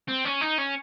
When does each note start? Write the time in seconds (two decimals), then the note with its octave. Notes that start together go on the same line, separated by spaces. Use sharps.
0.08 C4
0.25 C#4
0.41 D#4
0.58 C#4